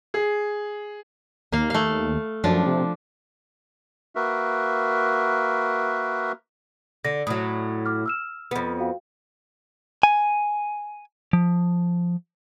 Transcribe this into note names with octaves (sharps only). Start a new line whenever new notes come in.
G#4
D#2 A#3 F5
A3 F5
F#2 F3 D4
C3
A#3 F#4 A#4 B4 E5
D3 A#6
A2 F#3 D#6
D6 F6
E6 F6 E7
F2 B3
F#4 F5 G5
G#5
F3